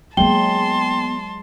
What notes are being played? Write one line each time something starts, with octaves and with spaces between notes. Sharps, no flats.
F#3 G#3 A#3 B3 G5 A5 C6 G7